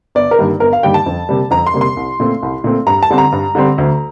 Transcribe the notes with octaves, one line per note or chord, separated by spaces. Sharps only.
G1 D5
A#4
G2 D#3 G3 A#3
G1 A#4
F5
G2 D#3 G3 A#3 G5
A5
F2
C3 G3 A#3
F2 A#5
C6
C3 G3 A#3
C6
C2
A#2 A3 C4
C2
A#2 A3 C4
G2 A#5
A5
D3 G3 C4
A#5
G2
D3 G3 C4
D2